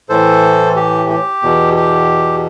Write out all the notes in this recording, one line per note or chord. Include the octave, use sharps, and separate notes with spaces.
A2 E3 A4 C5
G4
G4
E2 B2
G4